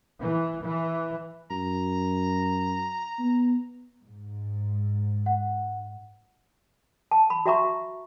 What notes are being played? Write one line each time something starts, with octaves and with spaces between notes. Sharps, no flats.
E3
E3
F#2 A#5
B3
G#2
F#5
A5
B5
F#4 E5 A#5 C#6